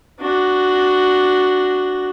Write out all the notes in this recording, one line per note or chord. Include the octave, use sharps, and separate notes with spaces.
D4 F#4